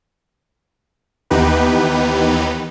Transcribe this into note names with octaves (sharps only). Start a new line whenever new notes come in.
D#2 E3 B3 D#4 G4 B4